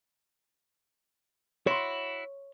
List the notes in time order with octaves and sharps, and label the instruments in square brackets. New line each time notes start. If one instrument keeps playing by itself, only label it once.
[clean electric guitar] E4 F#4 [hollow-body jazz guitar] C#5 C6